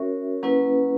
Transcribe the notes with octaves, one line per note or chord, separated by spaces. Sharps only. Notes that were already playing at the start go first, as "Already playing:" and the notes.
Already playing: C#4 F#4 A#4 C#5 E5
F#3 A#3 C#4 E4 B4